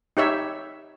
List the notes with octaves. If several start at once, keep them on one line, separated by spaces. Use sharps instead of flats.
D#4 G4 C#5 E5